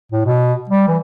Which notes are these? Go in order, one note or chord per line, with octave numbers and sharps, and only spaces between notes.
A2
B2
G3
E3